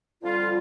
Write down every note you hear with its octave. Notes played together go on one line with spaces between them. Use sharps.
F2 D3 G3 F4